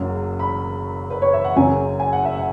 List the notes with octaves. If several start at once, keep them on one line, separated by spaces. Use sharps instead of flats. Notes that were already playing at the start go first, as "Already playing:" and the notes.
Already playing: F#1 F#2 C#3 F#3
B5
B4
C#5
E5
F#5
F#1 F#2 C#3 F#3 G#5
G#5
F#5
E5
F#5